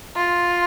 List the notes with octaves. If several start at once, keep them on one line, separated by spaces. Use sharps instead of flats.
F4